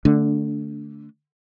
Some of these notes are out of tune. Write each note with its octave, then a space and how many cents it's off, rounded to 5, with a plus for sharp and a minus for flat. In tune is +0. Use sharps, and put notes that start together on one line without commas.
D3 +0 A3 +0 D4 -25